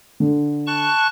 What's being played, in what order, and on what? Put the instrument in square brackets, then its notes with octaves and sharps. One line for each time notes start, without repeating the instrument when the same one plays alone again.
[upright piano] D3
[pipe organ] A5 C#6 F#6